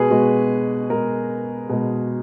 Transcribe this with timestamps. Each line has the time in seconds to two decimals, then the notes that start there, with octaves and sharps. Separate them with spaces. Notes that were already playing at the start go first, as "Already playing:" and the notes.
Already playing: B2 G#3 G#4 B4
0.10 B2 G#3 F#4
0.90 B2 G#3 A#4
1.69 B2 G#3